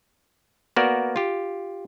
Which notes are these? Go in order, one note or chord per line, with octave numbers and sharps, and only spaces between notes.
A#3 B3 F#4 A#4 D5
F4 G4